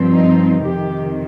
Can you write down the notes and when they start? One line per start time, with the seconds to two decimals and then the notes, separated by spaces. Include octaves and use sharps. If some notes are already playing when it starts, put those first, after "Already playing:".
Already playing: G2 F3 C4
0.10 D#4
0.62 F2 C3 D#3 G4